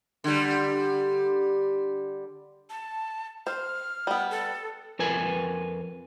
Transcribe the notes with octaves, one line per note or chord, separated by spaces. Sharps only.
D3 G3
A5
C5 F6
G3 B3
A4
F2 A#4 B4 G#5